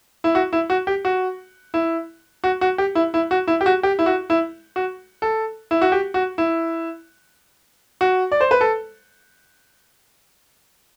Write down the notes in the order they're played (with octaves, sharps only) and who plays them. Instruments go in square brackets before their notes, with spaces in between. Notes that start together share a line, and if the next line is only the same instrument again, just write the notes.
[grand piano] E4
F#4
E4
F#4
G4
F#4
E4
F#4
F#4
G4
E4
E4
F#4
E4
G4
F#4
G4
E4
F#4
E4
F#4
A4
E4
F#4
G4
F#4
E4
F#4
D5
C5
B4
A4